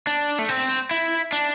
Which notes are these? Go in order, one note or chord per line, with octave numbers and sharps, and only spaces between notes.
D4
A3
C4
E4
D4